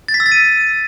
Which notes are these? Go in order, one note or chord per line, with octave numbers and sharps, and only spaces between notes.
A6
B6
E6
A6
D#7